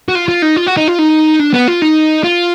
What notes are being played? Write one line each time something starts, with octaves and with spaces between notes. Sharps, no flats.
F#4
F4
F4
D#4
F4
F#4
D#4
F4
D#4
D4
B3
F4
D#4
F4